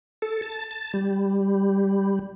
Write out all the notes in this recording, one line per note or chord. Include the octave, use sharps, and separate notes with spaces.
A4
A5
A5
G3